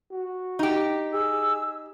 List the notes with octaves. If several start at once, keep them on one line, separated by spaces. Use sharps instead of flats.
F#4
D#4 G4
G#4 E6